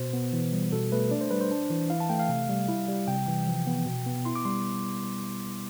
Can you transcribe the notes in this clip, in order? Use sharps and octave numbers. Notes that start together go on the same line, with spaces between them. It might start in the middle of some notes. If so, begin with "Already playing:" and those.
Already playing: B2 C5
B3
E3
G3
B2 A4
A3 B4
D4 D5
C5
G3 B4
C5
D4
E3
E4 F5
A5
A3 G5
F5
C3
G3
E4
G3
C3 G5
E3
F3
B3
B2
B3
E4 C6
D6
G3 C6